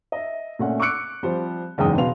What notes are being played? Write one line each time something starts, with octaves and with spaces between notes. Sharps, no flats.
D#5 E5
A#2 A3 C#4 F#5
C#6 D6 E6 F#6 C#7 D7
F3 G3 C4 G4 C5
F#1 E2 G#2 G#4 G5 D#6
B2 B4 F5 C6 F7